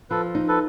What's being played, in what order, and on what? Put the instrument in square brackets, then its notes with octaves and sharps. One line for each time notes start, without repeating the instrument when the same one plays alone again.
[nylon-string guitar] F3 [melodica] A4 B4
[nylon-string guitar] D#4
[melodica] A4 B4